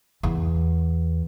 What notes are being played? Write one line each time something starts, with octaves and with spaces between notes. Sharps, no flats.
E2